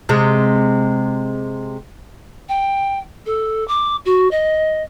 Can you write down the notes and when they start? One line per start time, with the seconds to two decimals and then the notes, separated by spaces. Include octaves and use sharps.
0.09 C3 G#3
2.49 G5
3.26 A4
3.68 D6
4.05 F#4
4.31 D#5